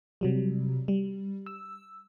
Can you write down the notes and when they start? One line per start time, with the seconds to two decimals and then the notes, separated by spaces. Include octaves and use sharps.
0.21 C3 F#3 G3
0.88 G3
1.46 E6